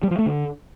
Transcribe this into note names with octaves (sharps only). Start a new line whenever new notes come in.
G3
F3
A3
D3